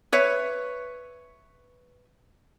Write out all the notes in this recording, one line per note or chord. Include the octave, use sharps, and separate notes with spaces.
B4 C#5 E5